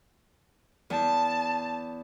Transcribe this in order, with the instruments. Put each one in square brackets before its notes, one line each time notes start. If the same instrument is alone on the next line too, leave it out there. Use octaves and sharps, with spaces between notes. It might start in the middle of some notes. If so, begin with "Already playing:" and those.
[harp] E2 [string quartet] A5